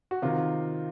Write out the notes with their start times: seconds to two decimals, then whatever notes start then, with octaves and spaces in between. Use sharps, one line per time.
0.11 F#4
0.22 C3 D#3 F4